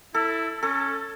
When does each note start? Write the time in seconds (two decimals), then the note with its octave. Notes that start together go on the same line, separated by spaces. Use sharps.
0.14 E4 A4
0.63 C#4 A4